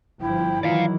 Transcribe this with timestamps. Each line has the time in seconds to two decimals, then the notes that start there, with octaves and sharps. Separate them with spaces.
0.21 G1 F3 E4 G5
0.63 D#3 E3 F#3 F4 D5 F5